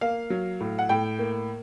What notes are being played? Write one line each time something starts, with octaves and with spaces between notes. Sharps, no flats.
A#3 F5
F#3
A2
F#5
A2 G5
A#3